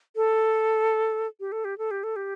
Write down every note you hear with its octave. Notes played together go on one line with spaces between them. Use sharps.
A4
G4
A4
G4
A4
G4
A4
G4